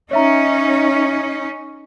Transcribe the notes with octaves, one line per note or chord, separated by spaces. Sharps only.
C#4 D#4 C#5 E5 A#5